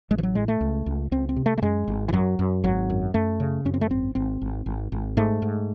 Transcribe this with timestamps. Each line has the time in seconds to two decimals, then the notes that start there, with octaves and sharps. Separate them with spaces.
0.10 A1 G#3
0.18 E3
0.23 F#3
0.35 A2 G#3
0.48 A3
0.61 C#2
0.86 C#2
1.11 C#2 C4
1.29 C4
1.36 C3
1.46 A3
1.58 A3
1.62 F#2 G#3
1.88 G#1
2.09 E3
2.13 F#2 F#3
2.39 F#2
2.64 G#1 F#3
2.90 F#2
3.14 F#2 A3
3.40 C#3
3.65 F#2 C#4
3.74 C4
3.81 A3
3.90 G#1 C4
4.15 G#1 C4
4.42 G#1
4.66 G#1
4.92 G#1
5.17 G#2 A3
5.42 G#2